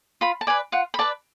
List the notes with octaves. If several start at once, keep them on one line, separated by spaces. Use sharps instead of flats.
F4 B5
A5
B4 D5 G#5
F4 F#5
B5
B4 D5 A5